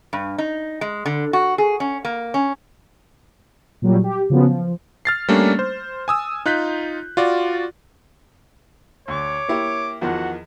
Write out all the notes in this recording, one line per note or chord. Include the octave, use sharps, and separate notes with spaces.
G2
D#4
G#3
D3
F#4
G#4
C#4
A#3
C#4
A#2 F#3 G3
G4
C#3 F3 F#3 B3
F3
F6 A6 C7
G3 A3 A#3 C#4 D4
C5
G#5 D#6 E6
D#4 F4 F#6 G6 B6
F4 F#4 D5
D2 C#5 D6
A#3 E4 G4
E2 D#3 F3 F#4 F#5